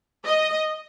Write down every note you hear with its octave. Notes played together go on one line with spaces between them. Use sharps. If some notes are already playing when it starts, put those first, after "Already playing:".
D#5